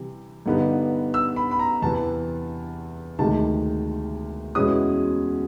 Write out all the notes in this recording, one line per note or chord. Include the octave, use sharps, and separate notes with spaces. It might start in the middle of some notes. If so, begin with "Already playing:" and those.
Already playing: C3 E3 G3
G2 D3 G3 B3 D#4
E6
B5
B5
A#5
E2 C3 E3 A5
D2 C3 D#3 G#3 A5
E2 B2 G#3 C#4 E4 D#6